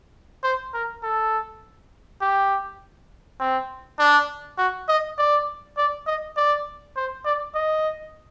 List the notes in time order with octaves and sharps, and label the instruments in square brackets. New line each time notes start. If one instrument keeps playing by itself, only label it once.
[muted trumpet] C5
A#4
A4
G4
C4
D4
F#4
D#5
D5
D5
D#5
D5
C5
D5
D#5